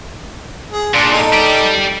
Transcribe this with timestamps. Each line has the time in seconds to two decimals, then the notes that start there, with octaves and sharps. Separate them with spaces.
0.71 G#4
0.94 A#2 D4 C6
1.13 D#4 A4
1.33 G4 D5